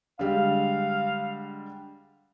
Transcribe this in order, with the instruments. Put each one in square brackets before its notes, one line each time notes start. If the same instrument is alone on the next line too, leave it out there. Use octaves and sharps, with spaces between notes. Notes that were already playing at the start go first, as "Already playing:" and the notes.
[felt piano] D3 G3 G#3 [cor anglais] F5